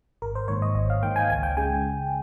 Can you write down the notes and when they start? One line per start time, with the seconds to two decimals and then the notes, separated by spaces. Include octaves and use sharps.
0.22 G#1 A#4
0.35 C5
0.48 G#2 D#3 A#3 C#5
0.62 D#5
0.75 G#1 D#5
0.90 F5
1.03 G#2 D#3 A#3 G5
1.16 G#5
1.30 C#2 G#5
1.43 G5
1.57 C#3 G#3 G#5